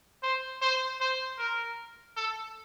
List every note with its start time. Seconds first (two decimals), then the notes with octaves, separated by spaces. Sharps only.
0.23 C5
0.62 C5
1.01 C5
1.39 A#4
2.16 A4